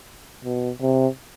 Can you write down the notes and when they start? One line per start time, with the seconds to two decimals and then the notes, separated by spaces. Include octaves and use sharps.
0.44 B2
0.81 C3